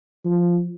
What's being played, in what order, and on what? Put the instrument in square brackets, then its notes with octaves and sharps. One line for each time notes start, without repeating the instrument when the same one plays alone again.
[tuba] F3